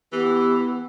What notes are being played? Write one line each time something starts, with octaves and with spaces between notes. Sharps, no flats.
E3 B3 G4